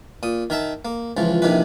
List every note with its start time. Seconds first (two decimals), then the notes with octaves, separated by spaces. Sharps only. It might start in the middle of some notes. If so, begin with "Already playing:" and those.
0.23 A#2 D#6
0.50 D#3 A#4 E5 A5
0.85 A#3
1.17 C#2 E3 F3
1.42 A#1 C3 D#3 E3 B4